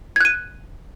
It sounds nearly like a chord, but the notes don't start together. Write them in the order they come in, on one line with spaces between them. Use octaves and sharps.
G#6 F#6 D#7